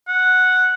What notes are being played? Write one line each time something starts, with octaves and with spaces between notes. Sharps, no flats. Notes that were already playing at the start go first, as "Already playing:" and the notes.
F#5